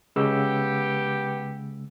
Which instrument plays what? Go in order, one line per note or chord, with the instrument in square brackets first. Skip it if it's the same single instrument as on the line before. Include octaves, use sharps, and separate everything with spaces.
[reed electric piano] C#3 G#3 E6 [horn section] B3 G4